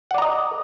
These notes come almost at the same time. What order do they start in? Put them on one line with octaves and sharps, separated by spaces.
F#5 D5 A#5 D#5